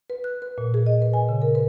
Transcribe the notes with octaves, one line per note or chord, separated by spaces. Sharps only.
B4
F#6
B4
A#2
G#4
D#5
B4
G#5
C#3
A#4
B4